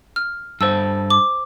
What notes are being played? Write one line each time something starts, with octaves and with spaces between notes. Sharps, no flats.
F6
G2 A4 C5 E6
D6